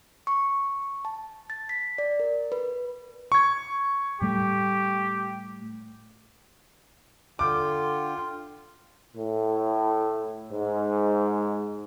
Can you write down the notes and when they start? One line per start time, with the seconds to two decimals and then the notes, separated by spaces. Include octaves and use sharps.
0.27 C#6
1.05 A5
1.50 A6
1.69 B6
1.98 D5
2.20 A#4
2.52 B4
3.32 C#6 G#6
4.21 A2 G3 A3 G4
7.39 D3 F4 G5 D6
9.16 A2
10.52 G#2